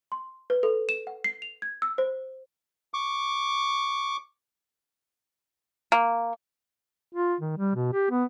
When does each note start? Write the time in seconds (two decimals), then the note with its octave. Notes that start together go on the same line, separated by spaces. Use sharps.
0.12 C6
0.50 B4
0.63 A4
0.89 E7
1.07 F#5
1.24 C7
1.42 F7
1.62 G#6
1.82 E6
1.98 C5
2.94 C#6 D6
5.92 A#3
7.13 F4
7.41 D#3
7.58 G3
7.75 B2
7.93 G4
8.11 B3